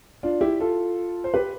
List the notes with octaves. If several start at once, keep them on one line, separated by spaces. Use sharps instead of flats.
D4 F4
E4 G4
F4 A4
C5
G4 B4